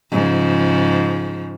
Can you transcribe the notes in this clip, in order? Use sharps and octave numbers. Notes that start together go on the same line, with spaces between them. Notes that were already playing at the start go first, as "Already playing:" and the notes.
G#2 C#3 F3